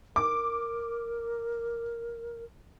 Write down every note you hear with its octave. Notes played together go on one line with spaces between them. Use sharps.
A#4 D6